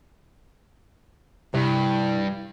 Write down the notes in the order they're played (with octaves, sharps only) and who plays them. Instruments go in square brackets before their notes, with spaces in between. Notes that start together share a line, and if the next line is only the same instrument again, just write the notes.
[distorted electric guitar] G2 [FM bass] C3 [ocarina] E4